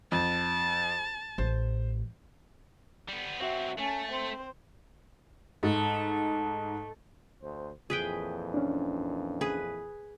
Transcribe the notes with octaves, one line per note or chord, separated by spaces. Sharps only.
F2 A5
A1 C5
G3 B3
F#3 C4 F#4 E5
A3 C#4 A5
C4 C5
G#2 A3
D2 C5
F2 A#2 E3 G#4 B4 G5
C#4 D4
G#4 B4